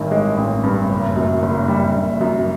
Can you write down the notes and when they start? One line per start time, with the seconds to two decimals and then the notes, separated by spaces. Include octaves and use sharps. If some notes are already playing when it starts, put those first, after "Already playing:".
Already playing: A1 G2 D#3
0.11 G#3
0.37 A1
0.63 G2
0.89 F#1
1.16 F#2
1.42 F#1
1.68 G3
1.94 F#1
2.21 F#2